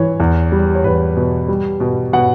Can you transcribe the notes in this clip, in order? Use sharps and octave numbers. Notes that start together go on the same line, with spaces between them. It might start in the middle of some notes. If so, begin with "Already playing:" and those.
Already playing: E3 C#5
E2
G3
C#5
E2 B4
B2
G3
B2
B2 F#5